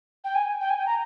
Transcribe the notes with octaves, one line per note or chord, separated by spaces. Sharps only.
G5
G#5
G5
G#5
G5
A#5